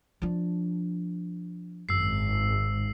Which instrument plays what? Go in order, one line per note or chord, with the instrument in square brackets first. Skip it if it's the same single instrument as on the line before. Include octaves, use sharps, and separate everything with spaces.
[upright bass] F3 D4
[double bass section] G#1 [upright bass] F#2 [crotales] E6 C7